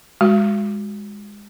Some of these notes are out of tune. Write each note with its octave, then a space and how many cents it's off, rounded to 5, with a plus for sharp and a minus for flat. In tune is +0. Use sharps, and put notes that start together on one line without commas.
G#3 -15 F#4 -5